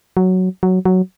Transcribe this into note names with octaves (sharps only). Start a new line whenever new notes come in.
F#3
F#3
F#3